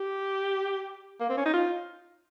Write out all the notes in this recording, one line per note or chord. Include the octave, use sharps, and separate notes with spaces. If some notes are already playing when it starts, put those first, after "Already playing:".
Already playing: G4
A#3
C4
C#4
D#4
F4